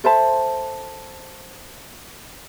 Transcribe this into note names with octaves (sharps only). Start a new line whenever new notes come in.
A4 C5 E5 A5